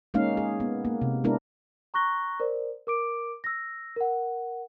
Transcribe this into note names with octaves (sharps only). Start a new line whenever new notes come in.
G#3 A#3 C#4 D#4 F5
G#4
B3
A#3
C3
G#3 B3 D4 E4 A#4
A#5 C#6 F#6 A#6 G7
A#4 C5 D5
A#4 D6 D7
E6 A#6
A#4 F#5